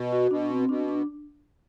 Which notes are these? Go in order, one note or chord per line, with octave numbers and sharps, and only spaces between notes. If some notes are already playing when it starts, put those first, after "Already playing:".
Already playing: B2
F#4
B2 D4
C4
B2 D4
D4